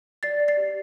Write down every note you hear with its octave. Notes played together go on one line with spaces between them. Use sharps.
D5 A6 C7
D5
A6 C7
G4